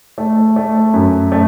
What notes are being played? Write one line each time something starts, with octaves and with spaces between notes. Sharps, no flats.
A3
A3
F#2
A3